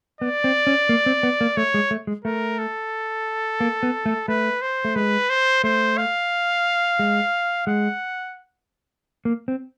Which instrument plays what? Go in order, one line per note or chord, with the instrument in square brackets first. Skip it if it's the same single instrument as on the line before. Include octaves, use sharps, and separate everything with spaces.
[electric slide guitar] B3 [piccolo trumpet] D5
[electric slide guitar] C4
C#4
A#3
C4
B3
A#3
[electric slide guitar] A3 [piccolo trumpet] C#5
[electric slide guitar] G#3
A3
G#3
[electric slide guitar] A3 [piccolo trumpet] A#4
[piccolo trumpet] A4
[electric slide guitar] A#3
B3
A3
[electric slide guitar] A3 [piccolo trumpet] B4
[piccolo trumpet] C5
[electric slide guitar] A3
[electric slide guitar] G#3 [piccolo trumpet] B4
[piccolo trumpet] C5
[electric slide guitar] A3 [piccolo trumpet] C5
[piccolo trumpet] F5
[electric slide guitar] G#3
[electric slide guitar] G#3 [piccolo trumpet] F#5
[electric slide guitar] A#3
C4